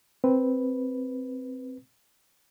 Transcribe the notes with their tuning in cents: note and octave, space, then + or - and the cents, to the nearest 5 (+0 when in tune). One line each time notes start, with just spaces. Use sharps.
C4 +0 B4 -5